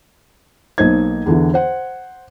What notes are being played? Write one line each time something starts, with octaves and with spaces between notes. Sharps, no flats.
B1 A#3 D#4 C5 G#6
E2 D3 E3
C5 F#5